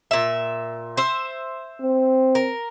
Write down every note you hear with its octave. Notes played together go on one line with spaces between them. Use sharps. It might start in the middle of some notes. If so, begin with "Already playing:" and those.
A#2 E5
C5 E5
C4
A#4